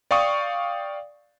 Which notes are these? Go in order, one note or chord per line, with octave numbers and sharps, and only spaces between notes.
D5 F5 G5 C#6 D#6